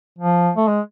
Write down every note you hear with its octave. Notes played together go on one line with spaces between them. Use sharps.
F3
A3
G#3